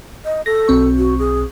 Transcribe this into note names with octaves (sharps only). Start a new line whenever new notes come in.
D#5
A4 A#6
B1 C4 C#6
F#4
G#4